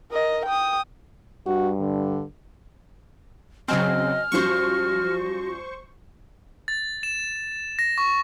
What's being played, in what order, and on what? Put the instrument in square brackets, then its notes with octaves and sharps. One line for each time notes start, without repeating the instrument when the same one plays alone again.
[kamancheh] A#4 D#5
G5 D#6
[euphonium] G2 [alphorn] F#4
[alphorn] D3
[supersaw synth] C#3 F#3 C4 [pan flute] D#5 [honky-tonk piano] G#5 [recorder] F6
[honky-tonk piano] F#2 F3 G3 [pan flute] F#4 [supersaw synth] C5 C#6
[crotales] A6
E7
A#6
C#6